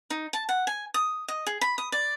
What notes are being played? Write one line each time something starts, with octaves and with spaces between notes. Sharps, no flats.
D#4
A5
F#5
G#5
D#6
D#5
G#4
B5
D#6
D5